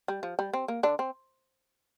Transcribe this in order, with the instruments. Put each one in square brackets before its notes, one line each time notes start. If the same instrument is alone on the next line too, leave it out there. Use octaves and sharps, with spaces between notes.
[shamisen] G3
F3
G3
C4
A#3
D3 D4
C4